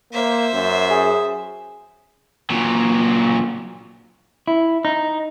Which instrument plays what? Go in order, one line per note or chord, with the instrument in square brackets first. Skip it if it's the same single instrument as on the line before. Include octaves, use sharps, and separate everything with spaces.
[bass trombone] A#3 [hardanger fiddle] C5 E5
[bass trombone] F#2
[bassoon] G#4
[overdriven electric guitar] A#2 F#3
[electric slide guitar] E4
D#4